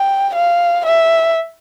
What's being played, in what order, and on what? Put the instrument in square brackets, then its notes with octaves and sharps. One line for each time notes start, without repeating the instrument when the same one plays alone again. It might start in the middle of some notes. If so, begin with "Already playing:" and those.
Already playing: [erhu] G5
F5
E5